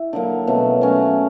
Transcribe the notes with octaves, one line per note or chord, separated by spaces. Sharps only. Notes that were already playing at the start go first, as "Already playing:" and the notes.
Already playing: E4
D3 F#3 A#3
B2 F#3 A3 C#4
F#3 A3 C#4 F#4